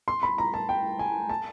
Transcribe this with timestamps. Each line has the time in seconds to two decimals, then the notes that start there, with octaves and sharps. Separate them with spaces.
0.08 C6
0.23 B5
0.38 A#5
0.54 A5
0.69 G5
0.99 G#5
1.29 A5